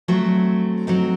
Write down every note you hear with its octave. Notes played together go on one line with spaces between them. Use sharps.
F#3 A3 C4
F#3 C4 D#4